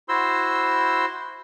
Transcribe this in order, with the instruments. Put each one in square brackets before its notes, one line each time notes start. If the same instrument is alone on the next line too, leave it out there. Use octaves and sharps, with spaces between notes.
[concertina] E4 F#4 C5 C6 E6